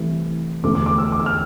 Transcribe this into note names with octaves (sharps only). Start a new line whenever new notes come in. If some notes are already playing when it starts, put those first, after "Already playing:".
Already playing: C2 C3 E3 A3
E1 D2 D3 F3 A3 D6
D6
D6
E6
D6
E6
F6